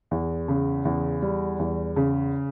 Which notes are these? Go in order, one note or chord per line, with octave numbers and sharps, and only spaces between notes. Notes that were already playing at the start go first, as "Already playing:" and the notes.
E2
C#3
E2
G3
E2
C#3